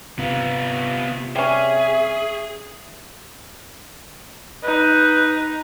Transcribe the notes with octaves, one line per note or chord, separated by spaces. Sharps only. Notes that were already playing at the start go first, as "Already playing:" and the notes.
C3 B3 F4
G3 C#4 G#4 E5
D#4 B4